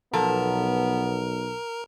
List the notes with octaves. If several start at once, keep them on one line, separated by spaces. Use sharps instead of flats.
B1 F3 B3 A4 A#4 A#5